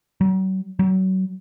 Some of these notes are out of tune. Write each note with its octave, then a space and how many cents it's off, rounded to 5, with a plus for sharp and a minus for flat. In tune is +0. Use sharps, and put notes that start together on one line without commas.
F#3 +40
F#3 +30